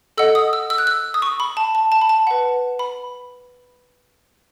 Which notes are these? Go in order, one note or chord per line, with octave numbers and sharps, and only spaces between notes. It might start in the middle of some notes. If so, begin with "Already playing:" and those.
A4 D#5 F#5 E6
D#6
E6
E6
F#6
E6
D#6
C#6
B5
A5
A5
A5
B5
A5
B4 F#5
B5